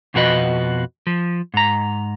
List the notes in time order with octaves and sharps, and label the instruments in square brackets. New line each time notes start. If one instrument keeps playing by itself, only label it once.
[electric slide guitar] F2 B2 F3 F#4 B4 D#5
F3
G#2 A#5